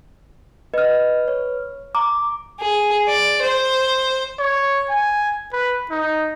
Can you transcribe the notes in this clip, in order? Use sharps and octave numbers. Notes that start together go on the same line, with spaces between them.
B4 D#5 F6
C#5
A#5 D6
G#4
D5
C5
C#5
G#5
B4
D#4